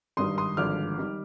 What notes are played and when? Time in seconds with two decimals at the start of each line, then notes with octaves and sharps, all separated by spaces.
0.17 G#1 G2 D#3 G3 C6 D#6
0.38 C6 D#6
0.57 G#1 G2 D3 F3 G#3 D6 F6
0.98 D#3 G3